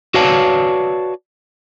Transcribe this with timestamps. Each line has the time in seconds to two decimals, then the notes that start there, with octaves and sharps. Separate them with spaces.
0.14 F#4 B4 C#5 D5 F5 A5